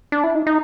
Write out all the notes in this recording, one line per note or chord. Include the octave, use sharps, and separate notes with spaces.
D4
E4
D#4
D#4